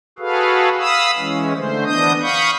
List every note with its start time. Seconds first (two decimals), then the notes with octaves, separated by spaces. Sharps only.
0.19 F#4 G#4 A4 B4 F5
0.79 F5 B5 D#6 E6
1.17 E3 G#3 C#4
1.55 D3 A3 C5
1.85 E3 B3 D4 D#5 D#6 G6
2.21 F5 B5 C#6 D#6 G6